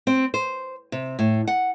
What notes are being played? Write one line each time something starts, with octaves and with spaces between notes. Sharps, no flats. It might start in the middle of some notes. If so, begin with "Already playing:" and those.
C4
C5
C3
A2
F#5